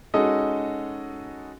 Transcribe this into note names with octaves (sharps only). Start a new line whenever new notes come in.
G#3 C#4 D#4 F#4 A4 D#5